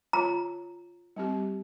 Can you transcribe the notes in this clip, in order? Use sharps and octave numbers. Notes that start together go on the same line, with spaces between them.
F4 C#5 A#5
G3 C4 G4